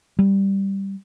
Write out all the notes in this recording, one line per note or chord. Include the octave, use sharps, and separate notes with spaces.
G3